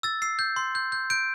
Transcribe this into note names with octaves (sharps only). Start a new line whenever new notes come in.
E6 A6
E6 C7
G6
C6
G6
G6
G6 D7